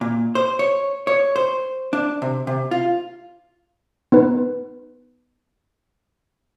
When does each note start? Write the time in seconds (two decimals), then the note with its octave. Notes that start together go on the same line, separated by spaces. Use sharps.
0.01 A#2
0.35 C5
0.59 C#5
1.07 C#5
1.36 C5
1.93 D4
2.22 C3
2.47 C3
2.71 F4
4.12 B3 D#4 B4